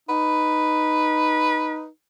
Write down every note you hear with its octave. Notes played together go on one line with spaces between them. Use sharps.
D#4 B4